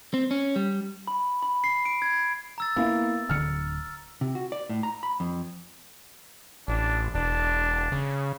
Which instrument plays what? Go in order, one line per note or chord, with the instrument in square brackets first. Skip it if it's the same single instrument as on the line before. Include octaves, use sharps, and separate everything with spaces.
[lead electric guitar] C4
C#4
G3
[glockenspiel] B5
B5
C7
D7
G#6
A#5 E6 A6
[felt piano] A#3 E4 F5 [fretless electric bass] B3
[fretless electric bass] D1 D3 [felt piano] F6 C#7
[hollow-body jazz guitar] C3
F#4
D5
A2
A#5
B5
F2
[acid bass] A1 [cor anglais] D4
[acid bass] E1 [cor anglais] D4
[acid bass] C#3